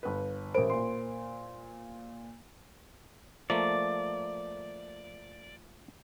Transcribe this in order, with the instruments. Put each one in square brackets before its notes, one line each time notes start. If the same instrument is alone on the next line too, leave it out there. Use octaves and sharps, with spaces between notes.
[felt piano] G1 B4
[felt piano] A1 D7 [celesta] A#4 C5 B5
[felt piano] A#2 C6
[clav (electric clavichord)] F3 A3 A#3 [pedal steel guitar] D5